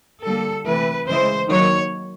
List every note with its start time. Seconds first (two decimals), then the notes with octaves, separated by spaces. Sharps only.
0.24 D3 G3 A#3 A4
0.66 C3 E3 A3 B4
1.08 C#3 E3 G#3 C5
1.49 D#3 F#3 A#3 C#5